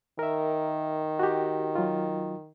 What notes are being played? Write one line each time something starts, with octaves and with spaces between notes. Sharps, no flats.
D#3 A#4 E5
F#4 G4
F#3 F4